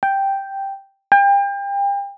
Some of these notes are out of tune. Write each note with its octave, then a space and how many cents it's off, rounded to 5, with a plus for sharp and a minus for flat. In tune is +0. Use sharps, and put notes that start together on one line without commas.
G5 +0
G5 +35